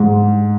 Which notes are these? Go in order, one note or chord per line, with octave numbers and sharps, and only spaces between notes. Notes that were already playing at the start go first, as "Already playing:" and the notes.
Already playing: G#2